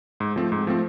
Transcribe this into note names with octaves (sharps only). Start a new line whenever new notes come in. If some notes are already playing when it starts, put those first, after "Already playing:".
G#2
F3 A3 C4
G#2
F3 A3 C4